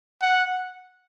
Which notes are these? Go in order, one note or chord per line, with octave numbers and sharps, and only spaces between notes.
F#5